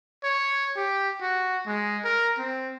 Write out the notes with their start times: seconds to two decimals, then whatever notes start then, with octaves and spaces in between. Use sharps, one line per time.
0.24 C#5
0.76 G4
1.22 F#4
1.67 G#3
2.05 A#4
2.38 C4